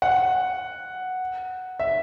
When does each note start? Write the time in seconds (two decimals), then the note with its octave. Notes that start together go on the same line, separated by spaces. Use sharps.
0.02 F#5
1.80 E5